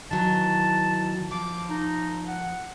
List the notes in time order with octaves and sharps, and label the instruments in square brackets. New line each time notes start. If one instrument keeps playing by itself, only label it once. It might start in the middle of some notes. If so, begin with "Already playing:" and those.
[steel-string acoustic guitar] D#3 E3 F#3 [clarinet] A5
[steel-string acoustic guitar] F3 [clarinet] D6
[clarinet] D#4
F#5